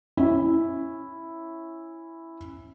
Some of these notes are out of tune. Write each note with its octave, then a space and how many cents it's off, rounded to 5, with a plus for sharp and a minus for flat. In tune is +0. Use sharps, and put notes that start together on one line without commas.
C#4 -15 E4 +0